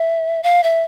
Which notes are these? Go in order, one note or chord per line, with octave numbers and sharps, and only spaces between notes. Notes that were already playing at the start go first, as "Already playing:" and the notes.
Already playing: E5
F5
E5